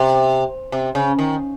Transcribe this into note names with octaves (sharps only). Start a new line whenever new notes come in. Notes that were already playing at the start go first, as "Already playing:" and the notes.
Already playing: C3
C3
C#3
D#3